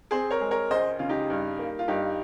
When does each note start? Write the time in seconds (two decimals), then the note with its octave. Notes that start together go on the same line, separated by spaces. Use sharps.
0.11 C4 G#4 C5
0.31 A#4 C#5
0.41 G#3
0.51 A#4 C#5
0.71 C#2 C5 D#5
0.99 C#3 F4
1.09 D#4 G4
1.30 G2
1.59 A#3
1.79 F4
1.88 G2 D#4 G4